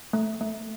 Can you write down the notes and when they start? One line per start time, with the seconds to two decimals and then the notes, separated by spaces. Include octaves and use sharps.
0.13 A3
0.41 A3